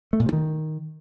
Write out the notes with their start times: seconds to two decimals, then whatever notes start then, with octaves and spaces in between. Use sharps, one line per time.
0.13 A3
0.20 A#2
0.26 C3
0.33 D#3